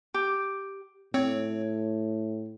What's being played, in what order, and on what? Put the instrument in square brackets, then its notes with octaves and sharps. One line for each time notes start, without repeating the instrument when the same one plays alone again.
[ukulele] G4
[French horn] A2 [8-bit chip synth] C4 [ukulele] C#5